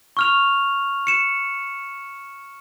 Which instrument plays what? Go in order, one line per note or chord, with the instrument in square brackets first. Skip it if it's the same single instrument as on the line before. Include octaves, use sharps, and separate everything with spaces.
[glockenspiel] C#6 F6 F7
C#7 E7